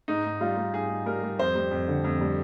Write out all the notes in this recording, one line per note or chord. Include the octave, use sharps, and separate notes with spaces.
G#2 D#4
G#2
G3 F4
G3
G#2 G#4
G#2
G3 A#4
G3
F2 C5
G3
F2
D3
F2
G3